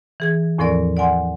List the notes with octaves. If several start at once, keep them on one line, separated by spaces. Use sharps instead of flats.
E3 G#4 G#6
E2 A2 F3 C4 A#4 D5
D5 F#5 G#5 C6